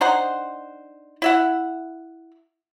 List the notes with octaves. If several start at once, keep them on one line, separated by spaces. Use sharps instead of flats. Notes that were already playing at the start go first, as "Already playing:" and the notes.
D4 D#4 C5 F#5
E4 E5 F#5